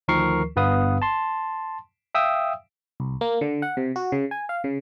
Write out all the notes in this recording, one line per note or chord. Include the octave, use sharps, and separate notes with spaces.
D2 D#3 F3 A#4 C#6 C7
G1 G2 B3 B4 F5 D#6
A5 C6
E5 F5 G5 D#6 E6
C2
A#3
D3
F#5
C3
F#4
C#3
G#5
F5
C#3